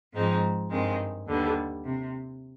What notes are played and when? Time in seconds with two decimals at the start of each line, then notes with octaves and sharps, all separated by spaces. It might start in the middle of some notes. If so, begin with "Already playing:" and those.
0.12 G#2 F3 G#3 C4 D#4
0.69 G2 D#3 G#3 C4
1.26 D#2 D3 G3 B3
1.83 C3